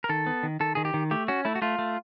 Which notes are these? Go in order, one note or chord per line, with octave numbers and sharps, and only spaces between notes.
A#4
D#3 A4
B3
D#3
D#3 A4
D#3 G#4
G4
D#3
A3 G4
C#4 F#4
A3 E4
F#4
A3 F4
A3